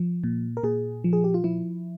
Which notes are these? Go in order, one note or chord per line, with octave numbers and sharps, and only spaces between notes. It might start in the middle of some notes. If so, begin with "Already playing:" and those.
Already playing: F3
A#2
A#4
A#2 G#4
F3
G#4
G4
F4
F3 E4